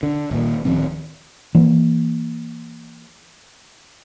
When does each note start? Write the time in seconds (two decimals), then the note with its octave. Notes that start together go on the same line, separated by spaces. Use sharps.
0.03 D3
0.31 D#1 D#2 A#2
0.65 D1 D#3 F3 C4
1.55 E3 A#3